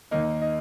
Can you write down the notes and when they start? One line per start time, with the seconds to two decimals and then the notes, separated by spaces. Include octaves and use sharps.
0.11 D#2 D#3 A#3 D#4 D#5
0.41 D#4 D#5